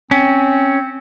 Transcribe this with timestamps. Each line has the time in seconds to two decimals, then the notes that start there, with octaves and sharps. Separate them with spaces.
0.11 C4 C#4